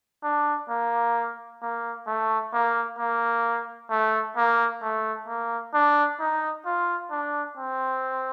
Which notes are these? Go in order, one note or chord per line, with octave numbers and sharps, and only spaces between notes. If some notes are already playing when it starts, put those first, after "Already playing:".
D4
A#3
A#3
A3
A#3
A#3
A3
A#3
A3
A#3
D4
D#4
F4
D4
C4